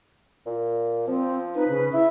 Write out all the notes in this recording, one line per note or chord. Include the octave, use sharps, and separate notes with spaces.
A#2
F3 C4
D#4 B4
C#3
E4 E5